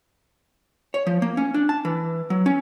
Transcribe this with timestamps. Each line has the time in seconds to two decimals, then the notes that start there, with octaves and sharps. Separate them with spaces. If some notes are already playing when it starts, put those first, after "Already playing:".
0.94 C#5
1.07 F3
1.22 A#3
1.37 C#4
1.54 D4
1.69 A5
1.85 E3
2.30 F#3
2.46 C#4